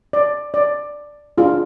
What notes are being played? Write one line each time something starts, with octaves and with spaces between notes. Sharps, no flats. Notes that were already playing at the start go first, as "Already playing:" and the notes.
D5
D5
D4 F4 G#4